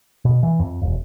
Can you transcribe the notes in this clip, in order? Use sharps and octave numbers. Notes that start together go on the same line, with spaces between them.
B2
E3
F2
E1